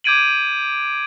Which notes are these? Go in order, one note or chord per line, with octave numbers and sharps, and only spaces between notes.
D6 G6 G#6 D7 D#7 F#7